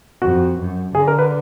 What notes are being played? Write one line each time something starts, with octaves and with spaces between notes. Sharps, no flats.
F2 F#4
F#2
D3 G#4
A#4
B4